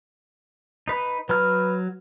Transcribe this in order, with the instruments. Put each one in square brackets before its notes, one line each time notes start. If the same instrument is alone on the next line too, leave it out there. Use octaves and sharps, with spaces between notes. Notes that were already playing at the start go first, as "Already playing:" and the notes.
[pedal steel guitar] D#4 B4
[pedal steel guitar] F#3 A#5 F6 [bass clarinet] B4